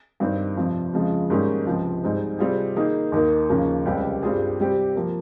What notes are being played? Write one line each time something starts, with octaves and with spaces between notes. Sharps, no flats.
G2 D#3 G3 C4
F2 C3 F3
F2 C#3 F3 G#3
G#2 D#3 G3 A#3 C#4
C#2 C3 F3
G#2 G3 C4 D#4
C3 G3 C4 F4 G#4
D#3 A#3 D#4 G#4
D#2 D#3 A#3
D#2 C#3 F3 A#3 C#4
C#2 C3 G3 C4 G4
G2 G3 C4 F4 G#4
C3 G3 C4 G4
F3 A#3